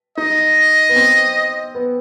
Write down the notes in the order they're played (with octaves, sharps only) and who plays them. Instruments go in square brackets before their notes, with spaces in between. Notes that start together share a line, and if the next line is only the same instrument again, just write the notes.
[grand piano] D#4 [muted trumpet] D#5
[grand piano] B3
C4
B3